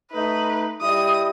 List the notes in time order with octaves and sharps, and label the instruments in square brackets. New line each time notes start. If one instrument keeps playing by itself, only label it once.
[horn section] A3 D#4 [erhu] B4
[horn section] G3 E4 D#5 [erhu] D#6